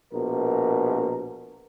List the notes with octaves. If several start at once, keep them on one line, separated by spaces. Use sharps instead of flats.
A#1 B2 A#4